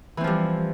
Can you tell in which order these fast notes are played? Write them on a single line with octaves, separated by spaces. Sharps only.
E3 C4 F3 G3